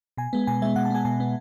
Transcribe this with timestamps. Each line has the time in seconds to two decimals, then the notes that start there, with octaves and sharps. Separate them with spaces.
0.17 B2 G#5
0.33 G#3 B3
0.47 B2 G#5
0.62 G#3 B3 E5
0.76 B2 F#5
0.85 A5
0.90 G#3 B3 G#5
1.05 B2 G#5
1.20 G#3 B3